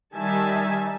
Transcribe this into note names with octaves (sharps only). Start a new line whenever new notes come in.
D#3 G3 E5 G#5 A5